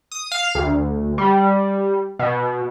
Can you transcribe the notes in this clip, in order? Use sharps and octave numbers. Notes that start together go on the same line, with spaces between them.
D#6
F5
D2
G3
B2